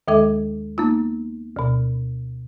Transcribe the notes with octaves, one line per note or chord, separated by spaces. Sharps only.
D#2 D#3 G#3 A4 E5 D6
A#3 B3 D#4 F4
D2 B2